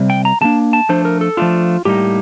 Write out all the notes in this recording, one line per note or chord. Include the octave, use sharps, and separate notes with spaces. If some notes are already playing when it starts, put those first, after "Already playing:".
Already playing: C3 G3
G5
A#5
C3 G3 A#3 D4 A5
A5
F3 A3 D4 C5
A#4
A4
F3 A3 D4 F4
A2 G3 A#3 D#4 G4